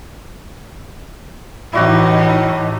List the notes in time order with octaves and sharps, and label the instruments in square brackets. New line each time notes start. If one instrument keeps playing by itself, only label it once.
[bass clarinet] A2 [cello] E3 D#4 [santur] E4 F#4 G4